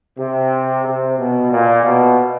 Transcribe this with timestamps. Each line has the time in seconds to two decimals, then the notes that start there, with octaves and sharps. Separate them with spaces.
0.19 C3
0.86 C3
1.18 B2
1.51 A#2
1.83 B2